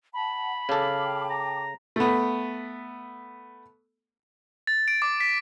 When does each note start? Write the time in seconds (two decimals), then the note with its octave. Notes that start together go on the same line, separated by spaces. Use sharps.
0.14 F#5 A5 B5
0.69 C#3 A4 F5 G5 A5 D6
1.30 A#5
1.96 A3 B3
4.67 A6
4.88 D7
5.02 D6
5.20 B6